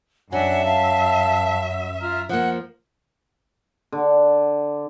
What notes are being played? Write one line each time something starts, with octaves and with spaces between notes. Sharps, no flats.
F#2 F#3 D4 E5 F#5 G#5
F5 A5
F4 A#5 F6
F3 A#3 F#5 F#6
D3